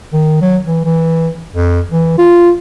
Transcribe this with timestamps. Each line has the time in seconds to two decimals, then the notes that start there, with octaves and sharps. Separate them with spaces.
0.13 D#3
0.41 F#3
0.66 E3
0.85 E3
1.54 F2
1.92 E3
2.18 F4